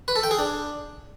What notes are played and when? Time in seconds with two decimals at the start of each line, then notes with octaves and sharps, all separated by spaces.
0.08 B4
0.16 A4
0.23 G5
0.31 G#4
0.39 D4